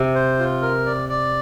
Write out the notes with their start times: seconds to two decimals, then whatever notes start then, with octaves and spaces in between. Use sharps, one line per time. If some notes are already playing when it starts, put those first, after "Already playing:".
Already playing: C3
0.15 C5
0.39 F4
0.62 A#4
0.86 D5
1.09 D5